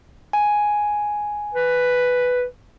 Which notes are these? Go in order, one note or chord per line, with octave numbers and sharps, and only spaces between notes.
G#5
B4